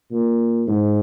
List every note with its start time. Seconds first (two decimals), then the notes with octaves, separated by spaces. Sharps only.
0.11 A#2
0.68 G#2